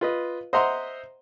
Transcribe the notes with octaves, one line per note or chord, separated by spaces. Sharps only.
F4 B4 D#5
C5 D#5 E5 F#5 A#5 C6